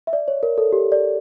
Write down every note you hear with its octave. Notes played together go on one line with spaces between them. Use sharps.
E5
D5
C#5
A#4
A4
G4
D5